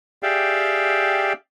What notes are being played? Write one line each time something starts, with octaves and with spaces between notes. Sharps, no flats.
G4 G#4 D5 E5 F5 G5